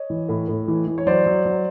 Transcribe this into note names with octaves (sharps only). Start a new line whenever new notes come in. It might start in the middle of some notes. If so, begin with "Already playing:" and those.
Already playing: C#5 D#5
E3
A2
A2
E3
E3
C#5
F#3 C5 D5
F#3
F#3